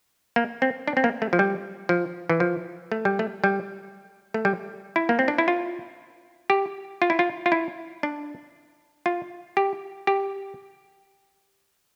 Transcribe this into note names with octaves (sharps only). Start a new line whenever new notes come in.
A#3
C4
D4
C4
A#3
A3
F3
G3
F3
E3
F3
A3
G3
A3
G3
A3
G3
E4
A#3
C4
D4
E4
F4
G4
F4
E4
F4
F4
E4
D4
F4
G4
G4